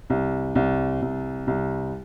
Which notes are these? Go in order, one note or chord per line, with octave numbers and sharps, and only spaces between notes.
C2
C2
C2
C2